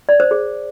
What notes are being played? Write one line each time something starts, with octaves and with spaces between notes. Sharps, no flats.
D5
C5
G#4